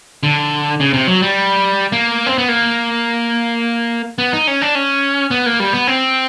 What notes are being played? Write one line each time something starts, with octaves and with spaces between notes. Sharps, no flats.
D3
C#3
C3
F#3
G3
A#3
C4
B3
A#3
B3
D#4
C#4
D4
C#4
B3
A#3
G3
B3
C4